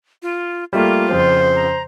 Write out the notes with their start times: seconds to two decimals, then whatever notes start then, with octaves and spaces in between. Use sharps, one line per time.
0.22 F4
0.73 G3 A3 A#3 F4
1.11 F2 C#3 F3 C5
1.55 A#5